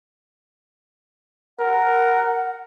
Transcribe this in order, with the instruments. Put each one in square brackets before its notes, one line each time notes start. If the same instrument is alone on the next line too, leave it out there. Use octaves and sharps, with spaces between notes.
[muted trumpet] A#4 [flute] F#5